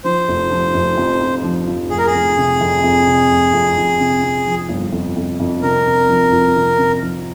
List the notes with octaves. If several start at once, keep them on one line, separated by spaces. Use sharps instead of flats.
F3 C5
F1
F3
F1
F2
F2
F3
F3
F1 G#4
A#4
G#4
F1
C3
F2
F2
C3
F1
F2
F3
C3
C3
F3
G1
F2
F2
F2
C3 A#4
C3
F3
F2
C3
C3
F3